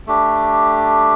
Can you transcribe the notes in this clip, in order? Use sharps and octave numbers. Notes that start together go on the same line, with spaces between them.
A3 D4 G4